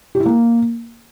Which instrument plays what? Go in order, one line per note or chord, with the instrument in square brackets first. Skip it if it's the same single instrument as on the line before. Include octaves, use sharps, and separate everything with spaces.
[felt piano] G4
E4
A#3